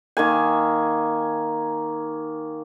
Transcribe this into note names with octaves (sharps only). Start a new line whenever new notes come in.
D#3 A#3 G#5